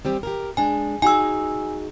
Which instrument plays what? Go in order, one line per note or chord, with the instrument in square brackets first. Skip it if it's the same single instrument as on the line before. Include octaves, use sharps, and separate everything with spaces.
[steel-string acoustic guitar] G3 C4 G4
G4 G#4 A#4
[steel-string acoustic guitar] G#3 D4 [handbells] G#5
[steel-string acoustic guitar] D#4 F#4 G#4 [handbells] G#5 E6